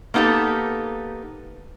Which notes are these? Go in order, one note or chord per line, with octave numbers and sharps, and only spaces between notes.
A#3 B3 D#4 G4 A4